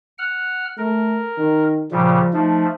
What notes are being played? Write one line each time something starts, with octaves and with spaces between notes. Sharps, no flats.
F#5 F6
A3 A#4
D#3
A#2 C#3 F3 G3
F3 A3 D#4